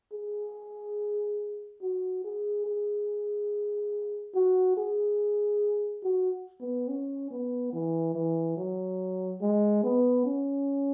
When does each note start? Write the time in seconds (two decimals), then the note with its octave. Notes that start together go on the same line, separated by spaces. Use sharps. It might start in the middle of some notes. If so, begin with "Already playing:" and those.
0.12 G#4
1.82 F#4
2.24 G#4
2.66 G#4
4.34 F#4
4.77 G#4
6.04 F#4
6.60 B3
6.88 C#4
7.30 B3
7.73 E3
8.15 E3
8.57 F#3
9.41 G#3
9.83 B3
10.26 C#4